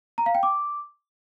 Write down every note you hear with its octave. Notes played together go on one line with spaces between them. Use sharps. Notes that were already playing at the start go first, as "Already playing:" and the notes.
A#5
F5
G5
D6